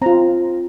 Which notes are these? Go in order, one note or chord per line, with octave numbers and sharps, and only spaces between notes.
C4 F4 A#5